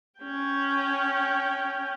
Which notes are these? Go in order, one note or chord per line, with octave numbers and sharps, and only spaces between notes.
C#4 G5